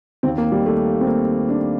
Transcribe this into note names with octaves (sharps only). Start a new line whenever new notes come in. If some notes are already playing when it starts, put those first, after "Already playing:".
D#2 D#3 C4
A#3
G3
A3
C4
A#3
D4